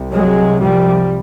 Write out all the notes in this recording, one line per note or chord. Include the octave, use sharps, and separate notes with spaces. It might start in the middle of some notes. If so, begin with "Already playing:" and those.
Already playing: C2 C3
F#3 G#3
F3 G3